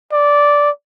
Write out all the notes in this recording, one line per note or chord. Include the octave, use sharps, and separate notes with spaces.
D5